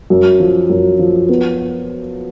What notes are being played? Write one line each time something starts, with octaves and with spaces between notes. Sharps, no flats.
F#2
F3
F#2
F3
B3